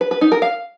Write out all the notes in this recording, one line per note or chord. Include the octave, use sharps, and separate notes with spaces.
B4
B4
D#4
A#4
F5